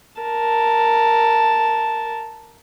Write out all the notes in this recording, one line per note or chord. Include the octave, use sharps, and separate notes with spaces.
A#4 A5